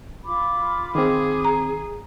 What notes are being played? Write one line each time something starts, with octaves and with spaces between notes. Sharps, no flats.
F4 B5 D6
D#3 C4 G#4
A#5